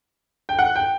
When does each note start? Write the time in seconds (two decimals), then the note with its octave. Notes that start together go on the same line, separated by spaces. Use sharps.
0.49 G5
0.59 F#5
0.76 G5